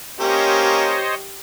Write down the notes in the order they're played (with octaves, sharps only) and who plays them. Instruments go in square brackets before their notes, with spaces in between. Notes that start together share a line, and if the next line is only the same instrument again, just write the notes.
[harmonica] A#3 C#4 A#4 [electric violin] G4 [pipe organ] C5 C#5 D#5